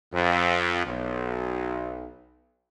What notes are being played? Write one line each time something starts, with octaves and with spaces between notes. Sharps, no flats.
F2
B1